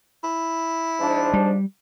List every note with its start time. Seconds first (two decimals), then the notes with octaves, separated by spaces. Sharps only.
0.24 E4
0.99 G#2 F3 D4
1.34 G3